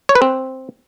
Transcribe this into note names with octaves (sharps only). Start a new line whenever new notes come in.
C#5
B4
C4